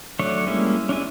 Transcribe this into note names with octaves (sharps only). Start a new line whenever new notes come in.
F#3 A3 D4 C#5
G3 G#3 A#3 C#4 E4
C#4 D4 E4 G#5